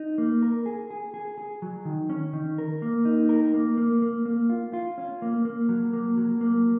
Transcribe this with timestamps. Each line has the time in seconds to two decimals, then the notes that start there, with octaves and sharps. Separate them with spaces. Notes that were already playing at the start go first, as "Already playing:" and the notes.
Already playing: D#4
0.18 A#3
0.42 A#4
0.66 G#4
0.91 G#4
1.14 G#4
1.38 G#4
1.62 F#3
1.85 D#3
2.10 C#4
2.33 D#3
2.58 A#4
2.82 A#3
3.05 D#4
3.29 A#4
3.54 A#3
3.77 A#3
4.02 A#3
4.26 A#3
4.49 F4
4.73 F4
4.98 C#4
5.22 A#3
5.45 A#3
5.69 F#3
5.93 A#3
6.17 F#3
6.41 A#3